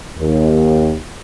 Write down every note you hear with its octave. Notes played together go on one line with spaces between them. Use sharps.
D#2